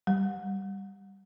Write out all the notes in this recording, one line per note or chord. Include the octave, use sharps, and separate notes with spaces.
G3